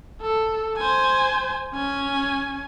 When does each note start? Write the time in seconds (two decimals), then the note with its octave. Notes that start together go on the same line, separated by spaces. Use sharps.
0.22 A4
0.77 C5 G#5
1.74 C#4 G#5